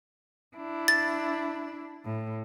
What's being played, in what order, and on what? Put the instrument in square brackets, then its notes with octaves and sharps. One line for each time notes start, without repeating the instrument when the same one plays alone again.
[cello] D4 E4
[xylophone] A6
[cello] A2